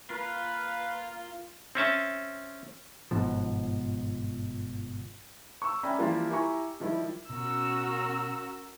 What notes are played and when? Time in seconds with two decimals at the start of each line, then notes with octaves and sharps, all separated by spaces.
0.10 A#3 F4 B4 F5
1.75 C4 C#4 E5 A5
3.11 G1 G#2 B2 F3
5.62 C#6 E6
5.83 C#4 D5 E5 G5 A#5 B5
5.98 E3 F3 G3 A#3 F4 G4
6.29 E4 G4 G#5 A#5 C#6
6.80 D#3 F3 G3 E4
7.30 B2 C#4 F#4 A#4 E6